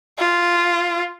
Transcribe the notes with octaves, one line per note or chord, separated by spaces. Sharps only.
F4